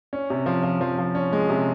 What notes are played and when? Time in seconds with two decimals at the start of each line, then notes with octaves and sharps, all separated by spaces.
0.13 C#4
0.30 C3
0.46 F3
0.63 F3
0.81 F3
0.98 F3
1.15 C#4
1.33 G#3
1.50 C3